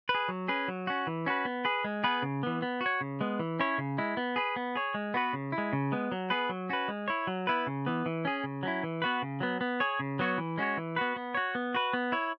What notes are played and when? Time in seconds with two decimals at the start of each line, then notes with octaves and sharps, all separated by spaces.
0.09 B4
0.15 G#4
0.28 F#3
0.48 C#4 G#4 B4
0.68 F#3
0.87 C#4 F#4
1.07 E3
1.26 C#4 F#4 B4
1.45 B3
1.65 G#4 B4
1.84 G#3
2.04 B3 G#4 B4
2.22 C#3
2.43 E3 B3
2.62 B3
2.81 F#4
2.86 C#5
3.01 C#3
3.21 G#3 B3
3.39 E3
3.60 C#4 E4 C#5
3.78 C#3
3.98 G#3 E4
4.17 B3
4.36 G#4 B4
4.56 B3
4.76 G#4 C#5
4.94 G#3
5.14 B3 F#4 B4
5.33 C#3
5.52 E4
5.58 G#3
5.73 C#3
5.92 G#3 B3
6.12 F#3
6.30 B3 G#4 B4
6.49 F#3
6.70 C#4 F#4 B4
6.88 G#3
7.08 E4 C#5
7.27 F#3
7.47 B3 E4 B4
7.67 C#3
7.86 E3 B3
8.06 E3
8.25 C#4 G#4
8.44 C#3
8.63 F#3 C#4 E4
8.83 E3
9.02 B3 F#4 B4
9.22 C#3
9.40 F#3 B3
9.61 B3
9.80 G#4 C#5
10.00 C#3
10.19 F#3 B3 F#4 C#5
10.38 E3
10.58 G#3 C#4 F#4 C#5
10.77 E3
10.96 B3 F#4 B4
11.16 B3
11.35 F#4 C#5
11.55 B3
11.75 F#4 B4
11.93 B3
12.12 E4 C#5